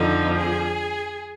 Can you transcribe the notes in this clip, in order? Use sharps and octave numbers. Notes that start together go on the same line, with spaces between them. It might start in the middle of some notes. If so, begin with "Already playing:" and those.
Already playing: F2 D3 F3 D#4
G#4